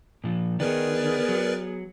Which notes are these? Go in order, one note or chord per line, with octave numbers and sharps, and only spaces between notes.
A#2 F3
D#3 B3 G#4 A#4 B4 D5
F#3